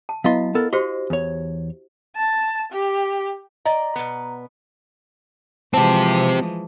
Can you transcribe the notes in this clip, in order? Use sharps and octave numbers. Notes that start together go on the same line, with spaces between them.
A5
F#3 B3 E4 D#5 F5 C6
B3 A4 A#4
F#4 G4 C5 D#5 C6
E2 C#5
A5
G4
D5 D#5 A#5
B2 B3
E3 F3 G#3 C4 G4 A5